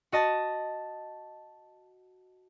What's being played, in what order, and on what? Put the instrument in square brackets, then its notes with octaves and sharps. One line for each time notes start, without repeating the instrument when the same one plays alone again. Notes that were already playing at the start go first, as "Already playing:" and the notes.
[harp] F#4 D#5 A5